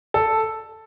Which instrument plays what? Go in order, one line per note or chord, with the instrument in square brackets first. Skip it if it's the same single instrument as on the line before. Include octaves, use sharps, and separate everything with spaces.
[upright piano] A4